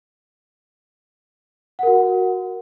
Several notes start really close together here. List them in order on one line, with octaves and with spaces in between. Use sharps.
F#5 A#4 F#4